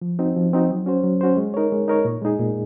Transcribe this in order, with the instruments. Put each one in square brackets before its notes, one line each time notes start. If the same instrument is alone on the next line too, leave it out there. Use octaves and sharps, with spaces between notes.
[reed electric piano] F3
C4 D#4 F#4
F3
C4 D#4 F#4
F#3
C#4 F#4 C5
F#3
C#4 F#4 C5
G#3
D#4 A#4 C#5
G#3
D#4 A#4 C#5
A#2
G#3 D#4 G#4
A#2